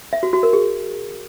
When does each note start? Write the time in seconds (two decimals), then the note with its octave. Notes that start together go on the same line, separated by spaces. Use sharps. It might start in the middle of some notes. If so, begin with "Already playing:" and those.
0.13 E5
0.23 F#4
0.33 F#4
0.43 A#4
0.53 G#4